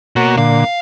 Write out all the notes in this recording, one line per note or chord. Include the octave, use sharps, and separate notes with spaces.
B2 A#3 F#4 C#5 F#5
A#2 D3 F5